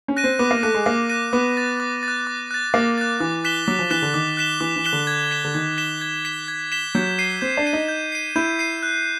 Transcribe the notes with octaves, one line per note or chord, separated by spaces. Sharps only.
C#4
F#6 A#6 D#7
C4
B3 D6
A#3
A3 F#6 A#6 D#7
G#3
A#3 D6
F#6 A#6 D#7
B3 D6
F#6 A6
D6
A6
F#6
D6
F#6 A6
A#3 D6
F#6 A6
E3 D6
F#6 B6 E7 G7
F#3 D6
F3
E3 F#6 B6 E7 G7
D3
D#3 D6
F#6 B6 E7 G7
E3 D6
E3
F#6 B6 E7 G7
D3
G#6
B6 E7 G7
D3
D#3 G#6
B6 E7 G7
G#6
B6 E7 G7
G#6
B6 E7 G7
F#3 G6
C7 D#7
C4 G6
D4
C7 D#7
D#4
G6
C7 D#7
E4 G6
C7 D#7
F#6